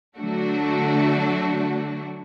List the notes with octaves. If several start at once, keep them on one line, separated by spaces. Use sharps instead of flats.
D3 F#3 A3 D4 F#4